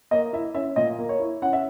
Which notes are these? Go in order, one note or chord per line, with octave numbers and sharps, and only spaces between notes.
A#3 D#5
E4 E5
C#4 E5
A#2 D#5
A#3
C#5
E4
C#4 F#5
E5